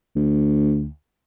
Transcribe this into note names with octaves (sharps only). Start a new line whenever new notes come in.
D2